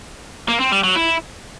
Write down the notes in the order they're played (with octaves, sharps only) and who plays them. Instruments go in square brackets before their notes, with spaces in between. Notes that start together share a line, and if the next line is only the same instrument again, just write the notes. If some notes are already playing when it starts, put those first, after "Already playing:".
[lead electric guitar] A#3
C4
G3
F#3
E4